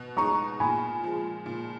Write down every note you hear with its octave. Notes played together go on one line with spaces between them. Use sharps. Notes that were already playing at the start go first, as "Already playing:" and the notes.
Already playing: B2
G#3 D#4 A#5 C#6
A#2 G#5 B5
F3 G#3
A#2